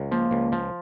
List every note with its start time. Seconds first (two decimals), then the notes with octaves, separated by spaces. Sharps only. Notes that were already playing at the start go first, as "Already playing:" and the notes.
Already playing: C#2
0.11 F3 A#3
0.31 C#2
0.52 F3